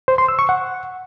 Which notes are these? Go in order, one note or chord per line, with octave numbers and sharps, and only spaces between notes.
C5
C6
E6
C#6
F#5